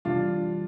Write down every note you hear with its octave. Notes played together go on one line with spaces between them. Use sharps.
C3 E3 G3 D4 F4